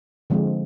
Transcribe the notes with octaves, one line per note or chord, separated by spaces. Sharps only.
D3 F3 G#3 C4